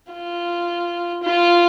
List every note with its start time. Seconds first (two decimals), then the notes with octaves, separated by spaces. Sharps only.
0.12 F4
1.23 F4